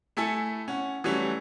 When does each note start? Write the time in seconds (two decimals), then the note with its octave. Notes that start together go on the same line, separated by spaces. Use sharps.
0.17 A3 E4 A4 G#5
0.68 C#4 F#5
1.04 E3 F#3 G3 A3 C#4